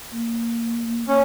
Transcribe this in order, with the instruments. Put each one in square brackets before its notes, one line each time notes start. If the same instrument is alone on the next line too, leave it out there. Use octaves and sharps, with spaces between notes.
[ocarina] A#3
[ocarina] A#3 [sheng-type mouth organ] C#4